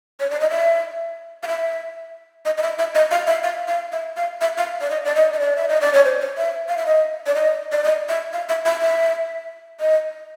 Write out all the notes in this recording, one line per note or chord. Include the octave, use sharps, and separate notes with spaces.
C#5
D5
D#5
E5
F5
E5
D#5
D#5
E5
E5
D#5
F5
E5
F5
F5
E5
F5
E5
F5
D5
D#5
D5
D#5
D#5
D5
E5
D#5
D5
C#5
C5
C#5
E5
F5
E5
D#5
D5
D#5
D5
D#5
E5
F5
E5
E5
E5
D#5